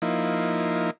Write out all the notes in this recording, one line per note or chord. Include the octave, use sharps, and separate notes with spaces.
F3 A#3 D#4 E4